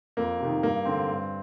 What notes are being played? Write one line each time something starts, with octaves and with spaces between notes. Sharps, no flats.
F2 A#3
C3 D#3
G2 A#3
D3 C4
G2